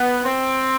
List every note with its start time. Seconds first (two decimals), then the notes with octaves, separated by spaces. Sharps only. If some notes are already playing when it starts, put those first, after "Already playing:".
Already playing: B3
0.24 C4